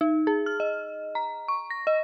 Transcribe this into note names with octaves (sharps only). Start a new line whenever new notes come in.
D#4
G#4
F6
D#5
A#5
C#6
A#6
D#5